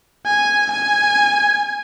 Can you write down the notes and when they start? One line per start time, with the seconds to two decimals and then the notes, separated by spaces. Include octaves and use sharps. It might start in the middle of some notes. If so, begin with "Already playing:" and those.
0.26 G#5
0.71 G#5